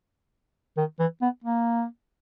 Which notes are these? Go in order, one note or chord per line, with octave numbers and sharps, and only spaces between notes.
D#3
E3
B3
A#3